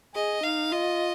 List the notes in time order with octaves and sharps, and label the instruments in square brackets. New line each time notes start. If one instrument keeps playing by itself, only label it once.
[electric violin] G#4 [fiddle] D#5
[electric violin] D#4 [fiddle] F5
[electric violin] F4 [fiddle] D#5